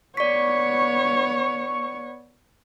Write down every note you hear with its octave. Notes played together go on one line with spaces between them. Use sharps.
B3 C#5 D5 C#6 B6